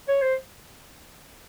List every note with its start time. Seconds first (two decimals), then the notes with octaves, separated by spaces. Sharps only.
0.08 C#5
0.22 C5